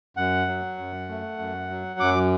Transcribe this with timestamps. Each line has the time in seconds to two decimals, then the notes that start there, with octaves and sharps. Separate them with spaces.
0.17 F#2 F#5
0.48 F#3
0.78 F#2
1.09 A3
1.39 F#2
1.70 F#3
2.00 F#2 D6